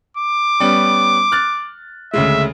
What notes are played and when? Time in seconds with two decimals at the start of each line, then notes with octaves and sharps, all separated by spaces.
0.17 D6
0.60 G3 B3 C#4
1.32 F6 F#6 A6
2.13 D2 C#3 G#3 E5